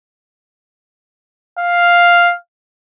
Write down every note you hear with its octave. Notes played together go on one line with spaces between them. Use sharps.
F5